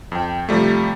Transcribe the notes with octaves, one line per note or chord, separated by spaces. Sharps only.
F2 G5
C3 F3 G3 A3